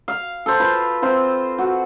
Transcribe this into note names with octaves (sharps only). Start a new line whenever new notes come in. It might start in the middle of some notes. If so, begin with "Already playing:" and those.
F5
A4 C5
F4 B4
C4 F4 C5
F#4